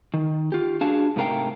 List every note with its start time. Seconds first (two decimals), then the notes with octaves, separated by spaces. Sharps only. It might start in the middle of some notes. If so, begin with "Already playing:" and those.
0.14 D#3
0.52 F4 G4
0.81 D4 F#4 G#4 F5 A5
1.16 G#2 C3 A3 A#4 F5 G5